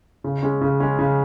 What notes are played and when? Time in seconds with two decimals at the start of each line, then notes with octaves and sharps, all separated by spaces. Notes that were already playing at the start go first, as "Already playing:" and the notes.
0.24 C#3
0.42 G#3 C#4
0.61 C#3
0.80 G#3 C#4
0.99 C#3